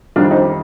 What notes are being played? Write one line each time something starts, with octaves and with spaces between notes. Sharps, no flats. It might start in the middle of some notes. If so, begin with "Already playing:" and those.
F2 D#3 G3 D4 F4
C4 D#4